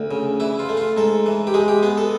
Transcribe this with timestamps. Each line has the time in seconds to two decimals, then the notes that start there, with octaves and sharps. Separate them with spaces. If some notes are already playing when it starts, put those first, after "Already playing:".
Already playing: D2
0.11 C#3
0.40 E3 E4
0.59 F4
0.69 A3
0.77 F4
0.97 G#2 A4
1.26 E3
1.47 G4
1.54 G#3 G#4
1.68 G4
1.83 B3 G#4
1.97 A4